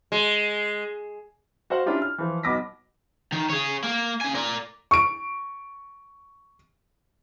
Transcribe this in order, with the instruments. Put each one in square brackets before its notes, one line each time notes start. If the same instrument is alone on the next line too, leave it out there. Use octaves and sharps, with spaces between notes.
[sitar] G#3
[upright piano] F#4 C5 F5 F#5
C#4 D4 E4 F4 G4
F6
E3 F3
B1 B3 D6 A#6 B6
[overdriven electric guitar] D#3
G#4 C#5
A#3
C#3 G#5
A#4 D5
[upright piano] C#6 D7